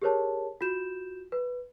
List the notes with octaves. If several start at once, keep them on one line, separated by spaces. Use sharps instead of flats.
G4 G#4 A#4 C5 C#5 A5
F4 F#4 G6 E7
B4